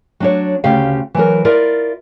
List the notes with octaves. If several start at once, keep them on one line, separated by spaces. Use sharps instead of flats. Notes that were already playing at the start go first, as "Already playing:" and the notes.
F#3 D4 C#5
D2 C#3 G4 F5
E3 F#3 A#4
E4 F4 A#4 D5